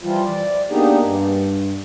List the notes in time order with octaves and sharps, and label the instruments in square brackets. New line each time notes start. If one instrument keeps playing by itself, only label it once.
[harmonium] E3 F3 G3 F4
D5
A#3 B3 D4 D#4 G4 G#4
G2